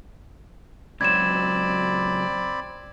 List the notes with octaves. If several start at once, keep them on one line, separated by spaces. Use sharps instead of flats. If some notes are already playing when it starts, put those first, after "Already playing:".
C#2 F#3 C4 D5 B5 G#6 E7